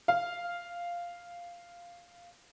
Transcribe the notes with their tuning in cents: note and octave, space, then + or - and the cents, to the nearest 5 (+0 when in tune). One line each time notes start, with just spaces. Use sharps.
F5 -5